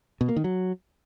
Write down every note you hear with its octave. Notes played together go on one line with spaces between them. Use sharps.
B2
A#3
D#3
F#3